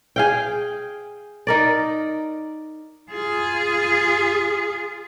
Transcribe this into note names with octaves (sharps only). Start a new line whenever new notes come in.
G#4 F5 G5
D#4 A#4 D5
F4 G#4